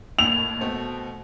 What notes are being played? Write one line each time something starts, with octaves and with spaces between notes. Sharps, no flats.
A#1 D#2 A2 F7
B2 A3 C4